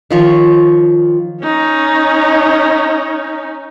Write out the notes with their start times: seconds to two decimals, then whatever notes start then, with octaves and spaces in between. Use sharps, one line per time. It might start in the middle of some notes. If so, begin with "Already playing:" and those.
0.10 D#3 F3 C#5
1.43 C#4 D#4